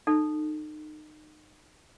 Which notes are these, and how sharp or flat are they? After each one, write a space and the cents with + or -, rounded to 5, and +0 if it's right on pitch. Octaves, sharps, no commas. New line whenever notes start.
D#4 -30 A4 +0